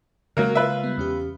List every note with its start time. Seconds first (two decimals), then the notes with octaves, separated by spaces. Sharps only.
0.37 C#3 F#3 G#3 A#3 A#4
0.55 F4 B4 E5
0.84 G3 B3
0.97 E2 C#4 G4